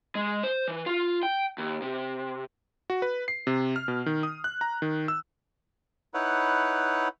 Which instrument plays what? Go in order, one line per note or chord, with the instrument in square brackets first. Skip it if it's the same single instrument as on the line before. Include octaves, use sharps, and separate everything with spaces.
[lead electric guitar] G#3
C5
E3
F4
G5
D#2
C3
[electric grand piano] F#4
B4
C7
C3
F6
B2
D#3
D#6
F#6
A#5
D#3
E6
[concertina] D#4 E4 B4 C#5 F#5